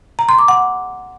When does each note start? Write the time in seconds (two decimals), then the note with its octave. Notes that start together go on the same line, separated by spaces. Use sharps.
0.19 A#5
0.29 C6
0.39 D6
0.48 F#5